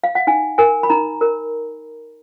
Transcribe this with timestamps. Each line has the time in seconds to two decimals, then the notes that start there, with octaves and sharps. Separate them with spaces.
0.04 F5
0.15 F#5
0.27 D#4 G#5
0.58 A#4 G#5
0.83 B5
0.90 D#4 A#5
1.21 A#4